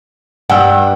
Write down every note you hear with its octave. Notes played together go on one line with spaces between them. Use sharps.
G2 F#5 G5 E6